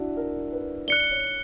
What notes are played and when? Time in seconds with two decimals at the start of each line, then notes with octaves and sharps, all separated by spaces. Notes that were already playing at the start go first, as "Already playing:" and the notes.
Already playing: D4 E4 F#4
0.17 A#4
0.52 B4
0.88 D5 F#6 C#7 G7
1.11 C#5